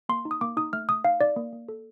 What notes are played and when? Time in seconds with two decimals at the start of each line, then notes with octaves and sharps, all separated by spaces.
0.09 A#3 C6
0.25 D#4
0.31 D#6
0.41 A#3 D6
0.57 D#4 D#6
0.73 A3 F6
0.89 A3 D#6
1.04 D#4 F5
1.21 D#4 D5
1.36 A#3
1.53 A#3
1.69 A4